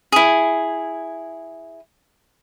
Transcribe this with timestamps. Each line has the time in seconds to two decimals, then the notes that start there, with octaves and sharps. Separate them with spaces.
0.12 E4 G#4